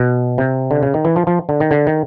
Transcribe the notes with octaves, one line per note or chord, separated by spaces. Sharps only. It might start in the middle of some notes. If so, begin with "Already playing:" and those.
Already playing: B2
C3
D3
C#3
D#3
E3
F3
F3
D3
D#3
D3
D#3